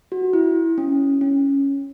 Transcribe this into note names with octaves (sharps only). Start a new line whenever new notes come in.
F#4
E4
C#4
C#4